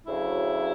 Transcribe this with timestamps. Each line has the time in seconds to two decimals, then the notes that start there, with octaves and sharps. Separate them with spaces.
0.06 D2 C#3 F#3 E4